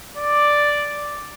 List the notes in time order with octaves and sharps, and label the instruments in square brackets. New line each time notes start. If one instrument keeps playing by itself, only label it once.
[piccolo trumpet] D5